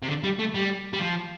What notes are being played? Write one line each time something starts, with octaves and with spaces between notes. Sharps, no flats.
C3
D3
G3
A3
G3
G3
F3